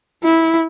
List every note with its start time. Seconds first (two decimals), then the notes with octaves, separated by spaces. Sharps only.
0.24 E4